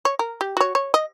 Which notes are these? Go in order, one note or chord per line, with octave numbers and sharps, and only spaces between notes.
C#5
A#4
G4
F#4 C#5
C#5
D#5